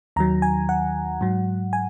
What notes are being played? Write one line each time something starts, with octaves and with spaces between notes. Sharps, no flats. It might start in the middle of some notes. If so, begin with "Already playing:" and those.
D#2 D#3 F#3 A#5
G#5
F#5
G#2 F#3
G#5